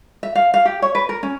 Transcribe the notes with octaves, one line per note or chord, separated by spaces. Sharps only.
E5
F5
F5
G4
C#5
B4
A#4
C#4